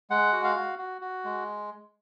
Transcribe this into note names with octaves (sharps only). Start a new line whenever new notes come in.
G#3 F#5
F#4
F5
F#4
F#4
F#4
G#3